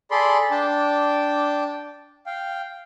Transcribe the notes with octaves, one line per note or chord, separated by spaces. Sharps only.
G#4 A4 D5 B5 C6
D4 G5 A5 D6
F5 G5